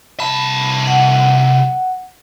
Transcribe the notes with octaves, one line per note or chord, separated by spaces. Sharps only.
C2 A5 B5
F#5